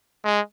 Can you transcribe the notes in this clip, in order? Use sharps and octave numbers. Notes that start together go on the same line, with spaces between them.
G#3